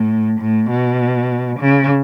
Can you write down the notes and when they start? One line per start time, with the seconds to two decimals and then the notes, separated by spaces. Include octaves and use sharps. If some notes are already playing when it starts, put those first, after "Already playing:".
Already playing: A2
0.41 A2
0.71 B2
1.60 C#3